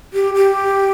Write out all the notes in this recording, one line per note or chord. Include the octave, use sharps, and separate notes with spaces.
G4
G4